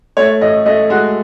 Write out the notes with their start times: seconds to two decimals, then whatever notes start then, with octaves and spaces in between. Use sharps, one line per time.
0.17 A3 C#5
0.41 A2 D#5
0.66 A3 D#5
0.90 G#3 F#4